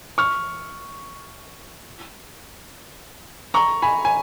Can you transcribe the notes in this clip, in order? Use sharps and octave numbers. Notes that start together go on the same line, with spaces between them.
C#6 F6
A#5 C#6
G#5 B5
G#5